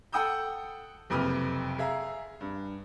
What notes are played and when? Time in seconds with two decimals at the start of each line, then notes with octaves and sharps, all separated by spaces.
0.12 A4 F#5 G5 D#6 E6 G6
1.10 F#1 F2 C3 B4 D#6 F6
1.79 G#4 E5 F5 A#5
2.41 G2